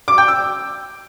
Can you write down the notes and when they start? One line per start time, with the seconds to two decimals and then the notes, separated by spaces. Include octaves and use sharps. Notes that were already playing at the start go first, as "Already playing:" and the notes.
0.08 D6
0.18 G5
0.28 E6